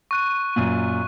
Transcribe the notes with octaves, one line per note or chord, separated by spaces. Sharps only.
C#6 F#6 D#7
F#2 A#2